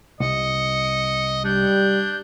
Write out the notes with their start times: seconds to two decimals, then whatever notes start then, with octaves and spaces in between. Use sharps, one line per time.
0.20 C2 D#5 C#7
1.44 G3 D4 G6